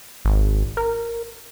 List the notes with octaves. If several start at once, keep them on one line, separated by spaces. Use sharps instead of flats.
G#1
A#4